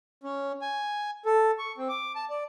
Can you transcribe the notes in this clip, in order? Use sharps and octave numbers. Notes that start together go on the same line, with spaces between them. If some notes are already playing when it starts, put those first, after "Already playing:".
C#4
G#5
A4
C#6
C4
D6
A5
D5